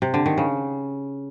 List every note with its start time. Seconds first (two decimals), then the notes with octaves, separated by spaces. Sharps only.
0.02 C3
0.14 D3
0.26 D#3
0.38 C#3